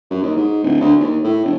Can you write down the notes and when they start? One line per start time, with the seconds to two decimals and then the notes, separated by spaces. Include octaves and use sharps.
0.10 F#2
0.22 D#2
0.36 G#2
0.63 D1
0.81 D2
0.99 D#2
1.24 A2
1.45 E1